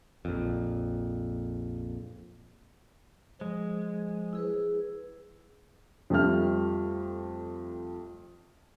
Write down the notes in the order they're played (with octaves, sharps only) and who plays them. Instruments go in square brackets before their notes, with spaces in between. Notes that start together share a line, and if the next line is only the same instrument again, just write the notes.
[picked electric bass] A#1 F2
[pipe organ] F3 [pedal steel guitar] G#3
[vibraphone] E4 G#4 B4
[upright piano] F2 G3 A3 F6